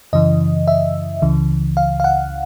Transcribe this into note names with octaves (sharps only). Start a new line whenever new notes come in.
F#2 C#3 E3 D#5
E5
C#2 C#3 E3
F5
F5
F#5